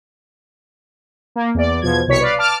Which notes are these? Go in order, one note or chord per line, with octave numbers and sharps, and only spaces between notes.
A#3
E2 D5
E2 B2 F3 G#6
C2 B2 C#5 B6 C#7
B4 D5 F5
A5 D6 F6